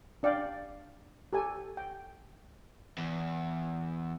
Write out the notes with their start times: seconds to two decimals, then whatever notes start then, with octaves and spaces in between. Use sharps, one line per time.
0.23 D4 D5 F5 G5
1.33 G4 A4 G#5
1.77 G5
2.98 E2